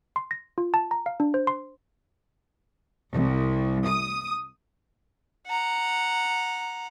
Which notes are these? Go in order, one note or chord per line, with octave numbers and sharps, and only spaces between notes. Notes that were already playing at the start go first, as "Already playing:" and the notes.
C6
A#6
F4
A5
A#5
F5
D4
C5
C6
C2
D#6
F#5 A#5